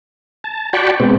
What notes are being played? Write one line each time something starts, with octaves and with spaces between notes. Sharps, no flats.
A5
F#4 D5 G5 A5 B5 C#6
B2 G#3 B3 C4